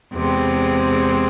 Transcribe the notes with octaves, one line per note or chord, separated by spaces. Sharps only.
E2 C3 G#3 C4